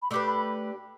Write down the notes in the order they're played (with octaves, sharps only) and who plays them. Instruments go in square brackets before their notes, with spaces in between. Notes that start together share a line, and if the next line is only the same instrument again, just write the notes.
[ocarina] B5
[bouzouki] A3 D4 G4 B4 [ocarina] D6
[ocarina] B5